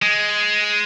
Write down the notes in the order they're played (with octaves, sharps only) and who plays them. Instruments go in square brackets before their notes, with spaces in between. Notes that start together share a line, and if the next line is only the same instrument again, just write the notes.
[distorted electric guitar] G#3